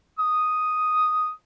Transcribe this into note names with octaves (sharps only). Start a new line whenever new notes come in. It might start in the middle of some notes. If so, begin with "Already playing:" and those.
D#6